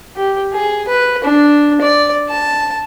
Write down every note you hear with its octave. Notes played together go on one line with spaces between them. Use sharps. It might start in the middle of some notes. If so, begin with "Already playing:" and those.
G4
G#4
B4
D4
D5
A5